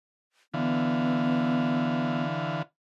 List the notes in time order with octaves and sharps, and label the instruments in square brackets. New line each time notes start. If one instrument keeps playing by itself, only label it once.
[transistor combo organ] D3 E3 F5 [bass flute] B3